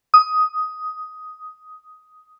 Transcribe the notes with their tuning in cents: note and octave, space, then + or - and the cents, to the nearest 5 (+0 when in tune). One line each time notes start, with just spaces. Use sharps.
D#6 +10